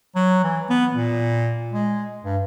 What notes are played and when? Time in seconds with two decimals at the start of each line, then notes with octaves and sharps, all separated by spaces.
0.15 F#3
0.44 E3
0.70 B3
0.93 A#2
1.72 G#3
2.24 G2